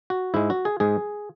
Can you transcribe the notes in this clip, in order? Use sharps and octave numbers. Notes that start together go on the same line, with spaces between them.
F#4
G#2 G#3 E4
F#4
G#4
G#2 G#3 G#4